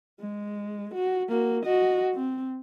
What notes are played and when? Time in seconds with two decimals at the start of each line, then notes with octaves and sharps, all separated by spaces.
0.20 G#3
0.94 F#4
1.29 A#3 F#4
1.64 F#4 D#5
2.14 C4